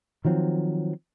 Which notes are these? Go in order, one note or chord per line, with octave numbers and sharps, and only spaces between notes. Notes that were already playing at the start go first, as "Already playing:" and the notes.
D#3 F3 F#3 C4